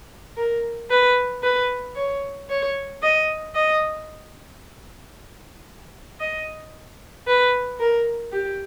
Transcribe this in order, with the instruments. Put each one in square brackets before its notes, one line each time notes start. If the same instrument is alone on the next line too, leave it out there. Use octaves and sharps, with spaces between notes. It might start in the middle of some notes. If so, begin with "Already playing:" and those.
[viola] A#4
B4
B4
C#5
C#5
D#5
D#5
D#5
B4
A#4
G4